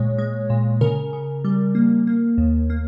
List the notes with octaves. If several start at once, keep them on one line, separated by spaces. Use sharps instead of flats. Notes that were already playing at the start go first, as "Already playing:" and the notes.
Already playing: A#2 G#3 C#5
G#3
A#2
C#3 A#4
C#3
G3
A#3
A#3
D#2
A#3